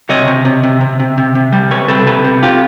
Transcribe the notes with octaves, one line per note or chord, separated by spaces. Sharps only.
C3 C#5 D#5
C3
C3
C3
C3
C3
C3
C3
G3
C3 B4 C#5
C3 A4 B4
C3 A4 B4
C3
F4 G4